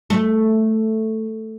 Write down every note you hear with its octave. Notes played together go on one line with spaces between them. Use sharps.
A3